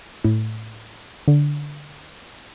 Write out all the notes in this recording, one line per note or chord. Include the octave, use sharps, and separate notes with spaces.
A2
D3